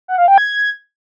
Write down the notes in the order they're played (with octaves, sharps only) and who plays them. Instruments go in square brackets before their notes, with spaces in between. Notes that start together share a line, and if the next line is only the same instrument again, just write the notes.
[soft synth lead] F#5
F5
G5
G#6